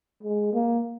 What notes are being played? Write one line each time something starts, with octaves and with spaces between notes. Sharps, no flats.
G#3
A#3